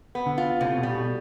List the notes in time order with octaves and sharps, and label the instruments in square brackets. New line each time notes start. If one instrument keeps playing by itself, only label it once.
[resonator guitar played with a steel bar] B3
[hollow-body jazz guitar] D3
[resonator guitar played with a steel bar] F4
[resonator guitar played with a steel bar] A2 [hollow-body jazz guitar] C3
[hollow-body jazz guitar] B2
[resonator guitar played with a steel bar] G3
[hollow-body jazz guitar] B2